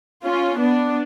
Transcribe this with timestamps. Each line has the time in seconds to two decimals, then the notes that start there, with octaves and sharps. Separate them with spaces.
0.25 C#4 F4
0.59 B3 D4